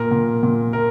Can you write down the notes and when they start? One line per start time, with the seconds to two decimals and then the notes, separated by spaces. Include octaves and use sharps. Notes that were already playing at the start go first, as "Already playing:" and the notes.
Already playing: A#2 A#4
0.11 A#2
0.43 A#2
0.73 A#4